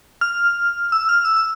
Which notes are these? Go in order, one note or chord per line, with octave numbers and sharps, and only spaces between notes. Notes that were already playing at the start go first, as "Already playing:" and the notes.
F6
E6
F6
E6
E6